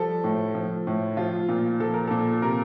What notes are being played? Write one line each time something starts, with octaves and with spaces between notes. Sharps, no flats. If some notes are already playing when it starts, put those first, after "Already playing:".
Already playing: F3 G3 A4
A2
F3
A2
F3 F4
A#2
F3 A4
A#4
A#2 A4
C3 A#4